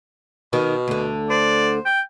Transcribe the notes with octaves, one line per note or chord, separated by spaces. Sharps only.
B2 D#3
D2 D3
C5 D5
G5